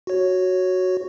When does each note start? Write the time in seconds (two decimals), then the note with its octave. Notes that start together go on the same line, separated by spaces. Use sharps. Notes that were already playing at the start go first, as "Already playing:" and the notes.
0.07 F#4 C#5